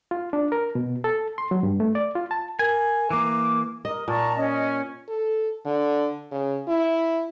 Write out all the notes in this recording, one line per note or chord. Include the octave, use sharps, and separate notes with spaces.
F4
D4
A#4
B2
A4
C6
F#3
G2
A3
D5
F4
A5
A#4 G#5
E3 A#3 D6
A#4 D#5
A#2 A5 A#5 C#6
C#4 D#5
A4
D3
C#3
E4